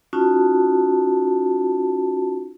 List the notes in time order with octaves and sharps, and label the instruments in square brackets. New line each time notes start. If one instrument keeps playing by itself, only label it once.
[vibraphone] C#4 D#4 F4 F#4 A5